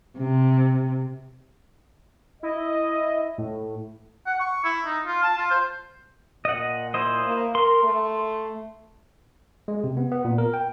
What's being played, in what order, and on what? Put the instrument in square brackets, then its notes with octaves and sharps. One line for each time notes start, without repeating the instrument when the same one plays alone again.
[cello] C3
[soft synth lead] E4 [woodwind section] D#5
[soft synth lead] A2
[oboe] F#5
C#6
E4
D#4
F4
A5
F4
C5
[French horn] A#2 [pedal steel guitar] D#5 F#5
[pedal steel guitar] E4 C5 D#5
[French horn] A#3
[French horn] A#4 [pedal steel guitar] C6
[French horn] A3
[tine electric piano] G#3
C3
B3
B3
A#2
A#4
G5